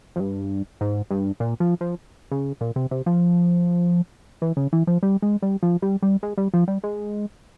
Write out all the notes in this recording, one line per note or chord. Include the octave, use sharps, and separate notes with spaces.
F2
G2
G#2
G2
A#2
F3
F3
C#3
A#2
C3
C3
F3
E3
C#3
E3
F3
G3
G#3
G3
F3
G3
G3
G#3
G3
F3
G3
G#3